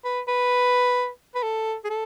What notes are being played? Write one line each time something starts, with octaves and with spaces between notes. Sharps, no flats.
B4
B4
B4
A4
G#4
A4